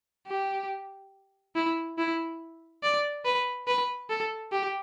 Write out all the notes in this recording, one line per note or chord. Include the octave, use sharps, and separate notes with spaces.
G4
E4
E4
D5
B4
B4
A4
G4